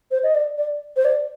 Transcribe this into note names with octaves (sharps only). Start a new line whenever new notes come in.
C5
D#5
D5
D5
C5
D5